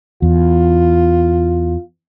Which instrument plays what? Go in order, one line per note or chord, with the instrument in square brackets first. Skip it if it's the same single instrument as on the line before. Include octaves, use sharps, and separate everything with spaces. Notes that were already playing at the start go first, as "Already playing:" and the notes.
[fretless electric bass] E2 [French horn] F4